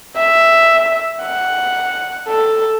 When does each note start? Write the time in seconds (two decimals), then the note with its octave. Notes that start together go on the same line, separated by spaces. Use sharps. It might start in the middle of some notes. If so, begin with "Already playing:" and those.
0.17 E5
1.23 F#5
2.28 A4